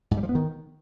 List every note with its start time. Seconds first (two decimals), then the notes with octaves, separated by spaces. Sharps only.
0.11 G#2
0.17 G3
0.23 F3
0.29 B3
0.35 D#3